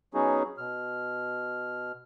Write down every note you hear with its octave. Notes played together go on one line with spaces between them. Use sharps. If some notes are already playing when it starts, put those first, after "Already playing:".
F#3 B3 C#4 D#4 F#4 G#4
B2 F6